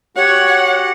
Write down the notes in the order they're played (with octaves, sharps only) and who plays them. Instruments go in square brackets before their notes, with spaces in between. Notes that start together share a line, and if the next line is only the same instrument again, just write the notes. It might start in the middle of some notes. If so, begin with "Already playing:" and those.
[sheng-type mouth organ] F#4 G4 [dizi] C#5 [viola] F#5